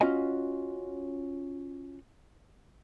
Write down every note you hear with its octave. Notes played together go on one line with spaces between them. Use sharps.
C#4 F4 F#4 D#5 G#5